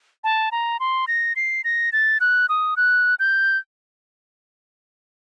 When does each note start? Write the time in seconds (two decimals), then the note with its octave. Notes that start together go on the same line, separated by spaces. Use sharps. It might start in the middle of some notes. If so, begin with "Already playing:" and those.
0.24 A5
0.52 A#5
0.80 C6
1.08 A#6
1.36 C7
1.64 A#6
1.93 A6
2.21 F#6
2.49 D#6
2.77 F#6
3.20 G6